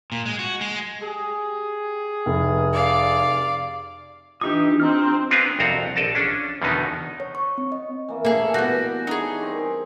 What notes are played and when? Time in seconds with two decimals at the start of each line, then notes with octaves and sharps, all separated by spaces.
0.12 A#2
0.25 G#3
0.39 F#4
0.61 G#3
1.01 G4 G#4
2.26 F1
2.73 D5 F5
4.41 E3 D4 D#4 F4 G4 D#6
4.80 C4 A#5 F6
5.30 B3 C4 D4 B4 F5 G#5
5.59 C2 F2 C4 F#4 A#5
5.96 A#1 A4 D5 D#5 A5
6.15 C#4 D4
6.62 E2 B2 D3 D#3 B3 D#4
7.20 C#5
7.35 C#6
7.58 C4
7.72 D#5
8.09 E3 A#3
8.25 A#3 C#4 G#4 A4 D5
8.54 G3 B3 F#4
9.07 D#4 G#4 C#5 A5 B5
9.39 C4 A#4 D5